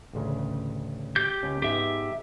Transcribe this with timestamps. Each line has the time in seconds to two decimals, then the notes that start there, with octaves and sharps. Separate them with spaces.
0.13 A1 D2 C#3
1.16 G4 G6
1.43 C#2 C#4
1.62 G#2 G#3 B3 G4 E5